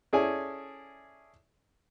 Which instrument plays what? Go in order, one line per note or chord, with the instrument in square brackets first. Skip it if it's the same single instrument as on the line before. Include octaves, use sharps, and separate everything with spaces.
[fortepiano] C#4 E4 G#4 A4 D5 G#5